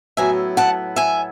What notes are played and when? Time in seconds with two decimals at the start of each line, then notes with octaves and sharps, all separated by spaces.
0.17 A2 F#3 B3 E4 E5 G#5
0.57 F#5 A5
0.96 E5 G#5